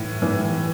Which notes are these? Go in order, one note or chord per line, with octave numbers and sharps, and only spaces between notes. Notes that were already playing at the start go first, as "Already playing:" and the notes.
Already playing: A2 E3
E3